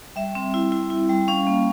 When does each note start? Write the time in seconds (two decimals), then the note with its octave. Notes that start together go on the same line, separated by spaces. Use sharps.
0.16 G3 E5
0.35 C4
0.54 E4
0.72 E4
0.90 E4
1.09 G3
1.28 C#4 F5
1.47 A#3